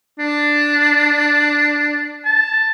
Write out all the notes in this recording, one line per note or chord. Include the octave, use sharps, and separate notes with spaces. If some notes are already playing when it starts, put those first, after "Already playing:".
D4
A5